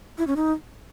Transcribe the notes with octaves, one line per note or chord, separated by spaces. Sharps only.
E4
C#4
D#4